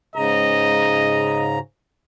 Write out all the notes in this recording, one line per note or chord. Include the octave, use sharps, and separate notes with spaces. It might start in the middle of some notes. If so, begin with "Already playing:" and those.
G#2 C#3 D#5 A#5